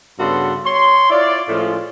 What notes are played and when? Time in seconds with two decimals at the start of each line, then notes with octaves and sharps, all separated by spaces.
0.19 G2 C#3 B3 F#4 A4 C6
0.65 C#5 C6
1.10 E4 F4 C#5 D5
1.48 A2 F3 G#3 A3 C#4 F4